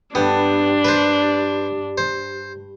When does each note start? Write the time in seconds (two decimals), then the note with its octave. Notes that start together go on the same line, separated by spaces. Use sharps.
0.15 G2 B3 D4 G4
0.85 B4 C5
1.98 C5